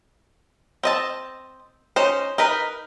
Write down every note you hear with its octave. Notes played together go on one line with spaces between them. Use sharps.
C4 D#5 A5
C#4 D#4 C5
D#4 A#4 B4